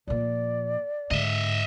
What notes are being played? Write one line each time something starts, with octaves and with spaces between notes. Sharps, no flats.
A#2 F3 D5
G#2 D3 D#5 E5